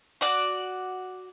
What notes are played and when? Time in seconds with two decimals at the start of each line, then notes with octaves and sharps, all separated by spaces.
0.21 F#4 D5 D6